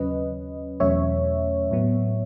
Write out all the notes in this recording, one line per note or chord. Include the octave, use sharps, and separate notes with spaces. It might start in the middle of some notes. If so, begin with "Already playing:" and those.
Already playing: D#2 C#3 F#3 C#4 B4 D#5
E2 B2 F#3 A3 C#4 C#5 E5
A2 F#3 B3